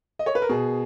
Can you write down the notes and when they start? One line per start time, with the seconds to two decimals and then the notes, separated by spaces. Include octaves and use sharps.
0.19 D#5
0.26 C#5
0.35 B4
0.42 A#4
0.49 B2 G#4